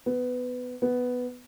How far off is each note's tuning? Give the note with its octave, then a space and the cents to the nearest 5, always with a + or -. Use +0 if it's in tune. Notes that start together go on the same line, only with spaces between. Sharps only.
B3 +15
B3 +5